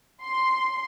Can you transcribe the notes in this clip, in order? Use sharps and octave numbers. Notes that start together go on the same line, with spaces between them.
C6